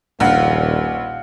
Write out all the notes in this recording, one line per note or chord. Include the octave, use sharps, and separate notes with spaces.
D#1 A#1 F5 F#5